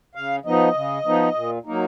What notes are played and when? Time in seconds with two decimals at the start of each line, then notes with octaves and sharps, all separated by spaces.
0.15 C#3 F5
0.45 F3 B3 D#4 D#5
0.75 C#3
1.05 F3 B3 D#4
1.35 A#2
1.65 F#3 A#3 D#4